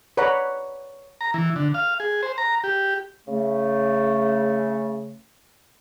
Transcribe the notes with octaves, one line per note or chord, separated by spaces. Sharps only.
B4 C#5 D5 F#5 A#5 B5
A#5
E3
D3
F5
G#4
C5
A#5
G4
C#3 A3